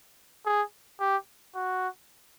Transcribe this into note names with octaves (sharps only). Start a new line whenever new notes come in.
G#4
G4
F#4